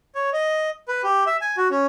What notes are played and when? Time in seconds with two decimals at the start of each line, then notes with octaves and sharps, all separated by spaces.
0.15 C#5
0.33 D#5
0.88 B4
1.04 G4
1.26 E5
1.41 G#5
1.57 F#4
1.70 C#4